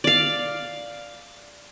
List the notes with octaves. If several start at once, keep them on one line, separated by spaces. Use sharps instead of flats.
D5 F5